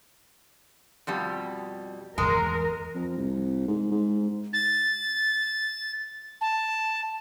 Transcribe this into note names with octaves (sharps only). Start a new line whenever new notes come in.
F2 B2 G3
E2 G#2 G#3 G#4 A#4
F2
C2
G#2
G#2
A6
A5